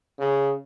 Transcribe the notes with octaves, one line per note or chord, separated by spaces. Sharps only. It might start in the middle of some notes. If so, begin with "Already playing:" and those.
C#3